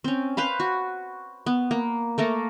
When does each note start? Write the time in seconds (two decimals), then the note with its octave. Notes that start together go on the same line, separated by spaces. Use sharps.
0.04 C4 C#4
0.37 B4 C5 F5 B5
0.60 F#4
1.46 B3
1.71 A#3
2.18 A3 A#3 A4 A#4